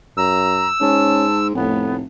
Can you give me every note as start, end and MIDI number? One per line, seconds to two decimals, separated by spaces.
0.17 0.71 42
0.17 0.68 82
0.17 1.47 88
0.81 1.52 44
0.81 1.26 61
0.81 1.39 81
1.55 2.03 29
1.55 2.02 45
1.55 1.95 59